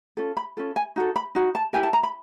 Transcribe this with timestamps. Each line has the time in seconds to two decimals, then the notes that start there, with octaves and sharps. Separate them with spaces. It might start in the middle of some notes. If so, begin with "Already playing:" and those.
0.17 C#4 F4 A4
0.37 B5
0.57 C#4 F4 A4
0.76 G#5
0.96 D#4 F#4 A4
1.16 B5
1.35 D#4 F#4
1.55 A5
1.73 E4 G4 A#4 G#5
1.83 A5
1.93 A#5
2.03 B5